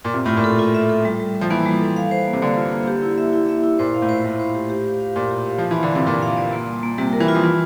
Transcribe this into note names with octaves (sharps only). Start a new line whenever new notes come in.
A#2
C3 F4
A2 F4
A#2
A4
F4
E5
A4
G3
G3
G3
F3
E3 A#3
G3
A4
F5
C5
A#3
C3
D3 A#3
F4
A#3
G4
E4
E5
E4
E5
E4
A#2 C5
F5
A2
C5
A2 C5
C5
G4
G4
F5
F5
A#2 D5
G4
F5
F3 D5
E3
F5
D3
C3 F5
A#2 A#4
F5
D5
A#3
G3
A#3
C3 G3
A#4
E3
F4
F3
E3 E4